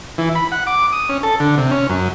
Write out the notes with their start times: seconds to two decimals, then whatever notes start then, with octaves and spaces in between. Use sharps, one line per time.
0.18 E3
0.35 B5
0.52 F#5
0.67 D6
0.92 D#6
1.09 C#4
1.23 A4
1.40 D3
1.58 C3
1.71 C#4
1.89 F#2